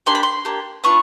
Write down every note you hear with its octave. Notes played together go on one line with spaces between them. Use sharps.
A#3 D4 G4 C6
B5
C6
A#3 D4 G4
B3 D4 F4 C#6